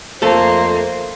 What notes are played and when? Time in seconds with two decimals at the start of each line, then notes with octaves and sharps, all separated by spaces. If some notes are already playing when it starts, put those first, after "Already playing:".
0.22 F2 A3 A#3 A4 C5